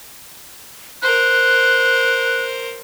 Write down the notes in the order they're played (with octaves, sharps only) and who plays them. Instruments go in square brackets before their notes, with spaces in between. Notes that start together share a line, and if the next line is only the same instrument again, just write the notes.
[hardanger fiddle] A#4 C5 [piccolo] F#6